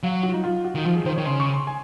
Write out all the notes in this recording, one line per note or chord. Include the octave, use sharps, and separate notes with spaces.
F#3 F5
F#4
F4
D#4
F4
F#4
D#3
F3 F4
G#4
D#3 C5
D#3 C#5
C#3 C6
C#6
C6
G#5